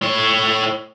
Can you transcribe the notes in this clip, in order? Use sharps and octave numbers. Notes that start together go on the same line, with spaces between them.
A2 C#5